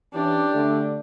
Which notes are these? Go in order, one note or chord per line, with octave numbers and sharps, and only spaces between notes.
E3 C#4 D4 G4
D3 A3